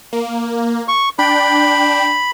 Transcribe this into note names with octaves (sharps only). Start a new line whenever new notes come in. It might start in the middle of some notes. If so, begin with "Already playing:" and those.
A#3
C#6
D4 G5 B5